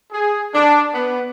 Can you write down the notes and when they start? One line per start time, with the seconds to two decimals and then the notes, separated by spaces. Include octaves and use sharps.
0.12 G#4
0.55 D4
0.94 B3